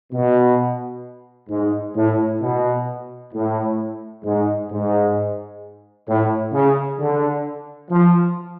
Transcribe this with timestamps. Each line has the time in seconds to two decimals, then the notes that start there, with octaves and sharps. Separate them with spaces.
0.13 B2
1.50 G#2
1.96 A2
2.42 B2
3.33 A2
4.25 G#2
4.71 G#2
6.07 A2
6.53 C#3
6.99 D3
7.91 F3